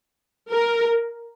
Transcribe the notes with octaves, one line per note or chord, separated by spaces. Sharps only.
A#4